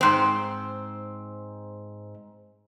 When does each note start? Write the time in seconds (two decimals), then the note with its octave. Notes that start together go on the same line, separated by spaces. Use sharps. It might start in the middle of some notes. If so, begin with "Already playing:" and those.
0.01 G#2 C4